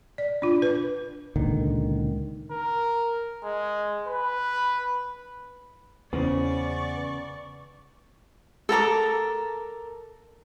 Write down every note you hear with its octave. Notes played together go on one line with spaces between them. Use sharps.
D5
D4 F4
B4
C#2 A#2 D3 D#3
A#4
G#3
B4
E2 C#3 B3 C#4 C5 D5 C#6
A4 A#4 A#5 D6